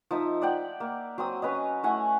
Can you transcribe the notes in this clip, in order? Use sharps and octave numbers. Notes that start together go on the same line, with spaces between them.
F3 D#4 E5
D5 F#5 G5
A#3
F#3 C4 D#6
C#4 B4 C#5 D#5
A3 E4 F#5 G#5